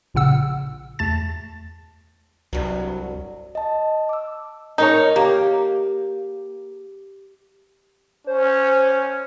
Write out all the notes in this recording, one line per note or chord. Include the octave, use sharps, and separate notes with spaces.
A#1 A#2 C#3 F#5 E6
E2 A3 A5 A6
C2 G2 F#3
D#5 A5
D6 E6
D#4 G#4 A#4 C#5
A#3 G4
C#4 C5